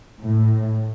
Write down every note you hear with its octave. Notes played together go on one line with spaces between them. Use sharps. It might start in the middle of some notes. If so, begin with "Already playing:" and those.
A2